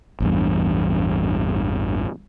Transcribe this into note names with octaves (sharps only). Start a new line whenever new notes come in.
A1 E2 G2